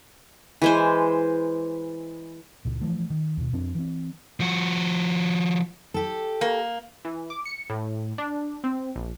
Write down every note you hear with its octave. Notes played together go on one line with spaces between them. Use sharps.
E3 G#3 C5
C#2 A#2
E3 F3 A3
D#3
D#2 B2
F2 C4 D4
E3 C4
F3 F#4
G4 A4
A#3
E3
D6
C#7
A2
D4
C4
A#1